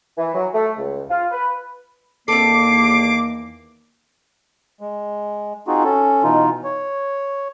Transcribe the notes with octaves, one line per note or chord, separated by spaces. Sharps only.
E3
F#3
A3
C#2
F4
B4
E2 D#3 A#3 C4 A4 D6 C7
G#3
C4 D#4 F4 F#4 G#4
C#4 A4
B2 E3 D#4 F4
C#5